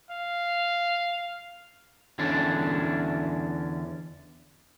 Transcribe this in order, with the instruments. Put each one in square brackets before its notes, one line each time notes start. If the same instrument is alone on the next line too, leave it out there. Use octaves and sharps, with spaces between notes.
[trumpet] F5
[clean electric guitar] E2 D3 C#4 D4